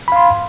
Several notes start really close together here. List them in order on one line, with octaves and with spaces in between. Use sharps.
B5 F5 C6